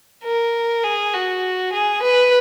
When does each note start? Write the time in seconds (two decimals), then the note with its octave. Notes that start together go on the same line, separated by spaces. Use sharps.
0.24 A#4
0.84 G#4
1.14 F#4
1.73 G#4
2.03 B4